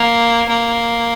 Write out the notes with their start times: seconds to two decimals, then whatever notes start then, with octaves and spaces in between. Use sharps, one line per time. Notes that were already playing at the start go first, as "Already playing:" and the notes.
Already playing: A#3
0.48 A#3